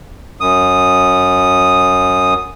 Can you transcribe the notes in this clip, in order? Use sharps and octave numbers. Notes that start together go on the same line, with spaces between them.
F#2 D#6